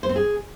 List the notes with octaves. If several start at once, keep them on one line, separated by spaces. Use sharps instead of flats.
C5
C4
G#4